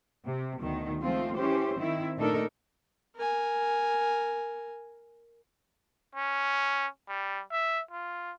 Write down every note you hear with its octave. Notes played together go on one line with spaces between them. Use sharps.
C3
D2 B2 D#3
F3 G#3 A3 C4 F4
E3 C#4 G4 C5
D#3 C4 E4
A#2 A3 D4 D#4 A4 A#4
A#4 G#5
C#4
G3
E5
F4